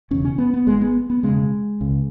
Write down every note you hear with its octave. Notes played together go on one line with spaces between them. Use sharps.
E1 E2 C#3 C#4
C#4
B3
B3
G#1 G#2 G#3
B3
B3
E1 E2 C#3 G#3
C#2 C#3